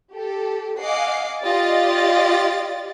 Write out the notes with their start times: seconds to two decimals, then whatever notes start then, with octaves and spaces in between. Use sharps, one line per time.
0.13 G4 A4
0.80 D#5 F5 F#5 G#5 D6 C7
1.43 F4 G4 D5 D#5 A6